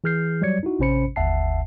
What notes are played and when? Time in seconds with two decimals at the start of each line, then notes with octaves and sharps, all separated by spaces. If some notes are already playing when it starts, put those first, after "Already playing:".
0.04 E3 G#4 F6 G6 C7
0.41 F#3 G3 C#5 D5 G#6 C#7
0.63 D#4 E4 F#4
0.79 A1 C3 C#4 C5 B5 C#7
1.16 G1 D#2 E5 F#5 A5 C7